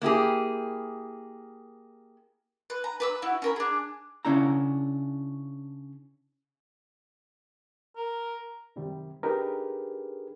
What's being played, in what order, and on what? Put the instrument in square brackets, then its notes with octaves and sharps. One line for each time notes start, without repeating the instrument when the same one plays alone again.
[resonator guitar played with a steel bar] A#3 E4 G4 G#4
[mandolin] B4
A#5
B4 D6 E6
E4 F#4
C#4 A#4 B5
D4 G#4
[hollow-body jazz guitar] C#3 C#4 D4 E4 A#5
[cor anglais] A#4
[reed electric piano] F#2 C3 D#3 G3
D4 D#4 G4 G#4 A#4 B4